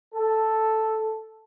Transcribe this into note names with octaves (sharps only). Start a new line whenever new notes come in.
A4